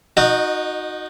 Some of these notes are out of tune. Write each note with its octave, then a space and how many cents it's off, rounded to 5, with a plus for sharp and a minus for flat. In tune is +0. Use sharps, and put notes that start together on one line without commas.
D#4 +0 F#4 -15 D#5 -30